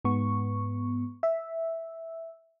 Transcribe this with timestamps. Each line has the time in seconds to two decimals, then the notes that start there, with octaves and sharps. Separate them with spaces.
0.05 G#2 B3 C#6
1.23 E5